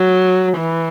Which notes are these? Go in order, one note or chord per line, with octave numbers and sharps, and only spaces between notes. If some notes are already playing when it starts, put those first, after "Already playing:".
Already playing: F#3
E3